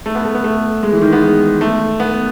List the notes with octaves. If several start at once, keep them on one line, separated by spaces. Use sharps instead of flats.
A3
B3
A3
B3
A3
G#3
E3
D#3
B3
G#3
A3
B3